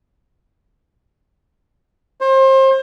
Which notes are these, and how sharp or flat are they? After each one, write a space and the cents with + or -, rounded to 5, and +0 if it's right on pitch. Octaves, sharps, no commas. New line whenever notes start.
C5 +30